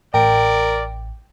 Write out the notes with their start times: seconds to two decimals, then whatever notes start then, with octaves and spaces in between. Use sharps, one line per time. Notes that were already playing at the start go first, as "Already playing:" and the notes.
0.14 A1 A#4 D5 G5